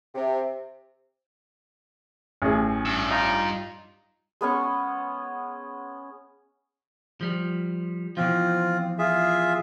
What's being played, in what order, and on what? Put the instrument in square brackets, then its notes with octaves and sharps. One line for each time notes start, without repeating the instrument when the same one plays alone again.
[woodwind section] C3
[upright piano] A1 G#4
[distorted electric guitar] G2 D4 [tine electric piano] E6
[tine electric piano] D#4 F4 A#5
[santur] G#3 B3 C#4 C#6
[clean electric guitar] F3 G3
[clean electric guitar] B2 E3 F3 [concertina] C4 F4
[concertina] F4 G#4 E5